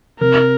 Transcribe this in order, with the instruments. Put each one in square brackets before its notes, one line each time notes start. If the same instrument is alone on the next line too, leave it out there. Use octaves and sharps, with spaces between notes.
[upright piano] C3 [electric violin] A#4